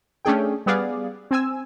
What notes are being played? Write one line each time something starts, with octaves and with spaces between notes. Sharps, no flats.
A3 C#4 D4 G#4 G5
G3 B3 G#4 D5 F5
C4 G#5 E6